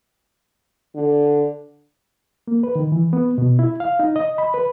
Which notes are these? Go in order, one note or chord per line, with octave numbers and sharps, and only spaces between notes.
D3
A#3
B4
D#3
E3
B3
B2
E4
F5
D#4
D#5
B5
B4